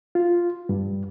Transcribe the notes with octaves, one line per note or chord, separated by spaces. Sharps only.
F4
G2